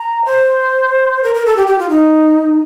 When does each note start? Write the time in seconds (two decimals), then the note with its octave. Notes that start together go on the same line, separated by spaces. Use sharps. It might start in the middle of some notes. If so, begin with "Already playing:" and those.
Already playing: A#5
0.25 C5
1.23 A#4
1.34 A#4
1.46 A4
1.57 G4
1.67 G4
1.79 F4
1.89 D#4